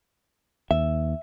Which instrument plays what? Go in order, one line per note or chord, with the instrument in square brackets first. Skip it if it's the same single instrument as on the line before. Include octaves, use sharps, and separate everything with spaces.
[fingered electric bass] D#2 [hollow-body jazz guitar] E5